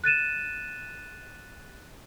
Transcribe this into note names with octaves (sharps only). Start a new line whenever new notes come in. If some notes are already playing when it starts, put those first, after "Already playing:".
F#6 A6 D#7 E7